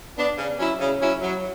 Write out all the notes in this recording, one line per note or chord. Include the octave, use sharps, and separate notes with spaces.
B3 D4
C#3
F#3 C#4 E4
C#3
F#3 C#4 E4
F#3